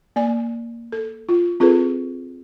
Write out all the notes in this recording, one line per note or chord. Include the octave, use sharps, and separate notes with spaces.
A#3 D5 G#5
A4
F4
C4 F4 G#4 A4 B4